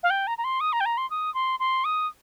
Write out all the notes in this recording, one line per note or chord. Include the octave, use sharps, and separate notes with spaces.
F5
G5
A#5
A#5
C6
D#6
A#5
G5
A#5
C6
D#6
C6
C6
D#6